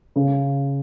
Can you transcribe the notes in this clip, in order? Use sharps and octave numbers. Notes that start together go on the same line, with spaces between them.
C#3